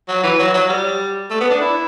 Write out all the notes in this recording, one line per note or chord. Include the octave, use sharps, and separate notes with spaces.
F#3
E3
F#3
F#3
G3
A3
B3
D4
E4